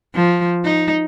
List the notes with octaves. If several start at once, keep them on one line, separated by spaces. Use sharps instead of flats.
F3
D#4